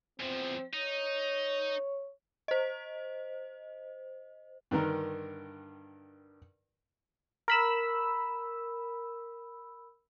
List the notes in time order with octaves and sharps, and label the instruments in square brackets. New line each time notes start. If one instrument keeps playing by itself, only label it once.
[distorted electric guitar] E2 F3 [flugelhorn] C4
[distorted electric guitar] D#4 [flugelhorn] C#5
[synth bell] C5 D#5
[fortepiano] G2 D3 D#3 A#4
[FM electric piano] A#4 B5 E6